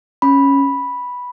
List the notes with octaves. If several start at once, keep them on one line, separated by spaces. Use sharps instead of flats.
C#4 B5